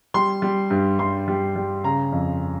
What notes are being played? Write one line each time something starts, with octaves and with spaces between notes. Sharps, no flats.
G3 C6
G3
G2
G2 C6
G3
G3
C#3 A#5
F2